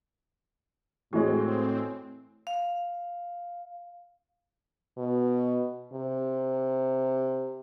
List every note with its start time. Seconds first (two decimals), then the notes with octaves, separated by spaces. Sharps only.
1.13 A2 E3 G#3 C4 F#4 C#5
2.47 F5
4.97 B2
5.93 C3